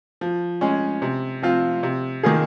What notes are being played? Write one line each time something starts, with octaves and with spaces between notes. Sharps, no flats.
F3
G#3 C#4
C3
F3 C4 F4
C3
D#3 A#3 F4 G#4